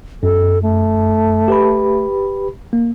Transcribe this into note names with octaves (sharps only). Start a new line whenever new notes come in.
F#2 A4
A3
G4 B4 B5
A#3